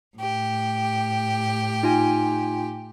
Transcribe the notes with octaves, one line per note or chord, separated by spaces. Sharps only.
A2 G4
D#4 F4 G#5